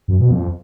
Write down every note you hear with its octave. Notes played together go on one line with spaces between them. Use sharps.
F#2
B2
F2